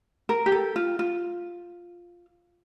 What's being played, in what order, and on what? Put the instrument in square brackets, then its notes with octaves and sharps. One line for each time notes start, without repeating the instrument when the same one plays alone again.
[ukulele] A#4
G4
A4
F4
F4